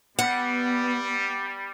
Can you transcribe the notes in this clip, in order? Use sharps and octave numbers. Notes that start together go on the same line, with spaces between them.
G3 B3 F#5